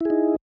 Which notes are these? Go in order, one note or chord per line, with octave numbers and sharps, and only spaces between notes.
D#4 E4 G#4